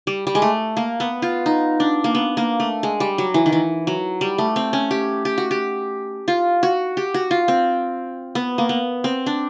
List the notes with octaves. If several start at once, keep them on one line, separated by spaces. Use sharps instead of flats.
G3
G3
G#3
A3
A#3
B3
F4
D#4
D4
A#3
B3
A#3
A3
G#3
G3
F#3
E3
D#3
E3
F#3
G3
A3
C4
C#4
G4
G4
F#4
G4
F4
F#4
G4
F#4
F4
C4
B3
A#3
B3
C4
D4